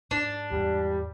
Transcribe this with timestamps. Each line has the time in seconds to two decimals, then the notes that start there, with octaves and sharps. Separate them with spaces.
0.11 G#2 D4
0.51 E2 G#2 G3